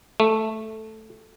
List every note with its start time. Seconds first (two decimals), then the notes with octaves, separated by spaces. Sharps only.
0.20 A3